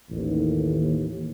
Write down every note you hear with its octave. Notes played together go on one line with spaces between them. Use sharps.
A1 D#2